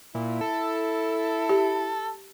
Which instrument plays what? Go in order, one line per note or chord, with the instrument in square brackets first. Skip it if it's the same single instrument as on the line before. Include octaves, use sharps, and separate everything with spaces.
[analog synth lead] A#2 [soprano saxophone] E4
[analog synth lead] A4
[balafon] G4